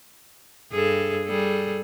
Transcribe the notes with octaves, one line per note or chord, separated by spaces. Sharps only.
G2 G#4 A4
G3 G#4 A4